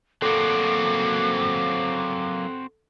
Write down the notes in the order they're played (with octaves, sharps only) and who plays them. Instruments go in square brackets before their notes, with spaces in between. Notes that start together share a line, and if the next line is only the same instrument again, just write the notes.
[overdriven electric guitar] F#3 A#3 [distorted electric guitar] C4 F#4 [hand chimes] A4 [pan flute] D6